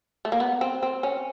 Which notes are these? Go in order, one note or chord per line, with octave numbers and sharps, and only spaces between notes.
A3
A#3
B3
C4
C4
C#4